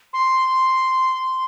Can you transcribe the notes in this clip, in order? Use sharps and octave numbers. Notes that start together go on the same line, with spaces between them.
C6